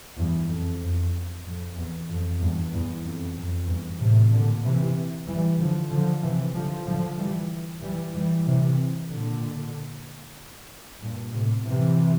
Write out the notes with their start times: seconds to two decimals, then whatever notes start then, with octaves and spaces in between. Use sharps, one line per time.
0.16 E2 G2
0.49 F2
0.81 F2
1.45 F2
1.76 E2
2.08 F2
2.40 E2 G2
2.72 E2
3.04 F2
3.36 F2
3.67 E2 G2
3.99 A2 C3
4.32 A#2 D3
4.64 C3 E3
5.27 E3 G3
5.58 D3 F3
5.90 D3 F3
6.22 C3 E3
6.55 D3 F3
6.86 D3 F3
7.18 E3 G3
7.82 E3 G3
8.14 E3 G3
8.46 C3 E3
9.09 A#2 D3
11.01 G2 A#2
11.33 A2 C3
11.64 C3 E3